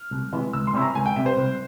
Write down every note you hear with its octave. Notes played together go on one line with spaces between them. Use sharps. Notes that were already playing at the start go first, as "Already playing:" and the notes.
Already playing: F6
C2
C3 E3 G#3
C#2 E6
C6
C3 G3 C#4 E4
A#5
C#2 G#5
G5
C3 G3 E5
C5
C2